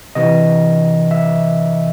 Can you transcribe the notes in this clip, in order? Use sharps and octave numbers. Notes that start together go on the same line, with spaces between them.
C3 E3 D#5
E5